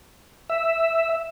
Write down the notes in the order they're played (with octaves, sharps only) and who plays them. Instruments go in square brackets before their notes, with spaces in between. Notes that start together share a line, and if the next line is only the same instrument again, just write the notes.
[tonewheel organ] E5